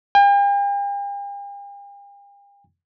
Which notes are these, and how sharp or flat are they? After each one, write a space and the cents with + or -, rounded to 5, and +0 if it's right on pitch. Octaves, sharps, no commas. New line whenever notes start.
G5 +45